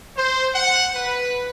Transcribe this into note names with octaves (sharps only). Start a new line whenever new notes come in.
C5
F#5
B4